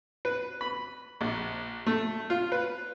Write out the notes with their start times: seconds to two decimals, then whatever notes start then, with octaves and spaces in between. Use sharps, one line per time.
0.25 B4
0.61 B5
1.21 A#1
1.86 A3
2.30 F4
2.52 B4